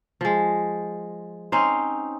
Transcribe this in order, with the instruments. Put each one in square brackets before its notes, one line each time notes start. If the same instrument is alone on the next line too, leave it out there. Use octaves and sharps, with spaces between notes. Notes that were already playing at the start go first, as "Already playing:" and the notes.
[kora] F3 G#3
C4 C#4 D#4 C5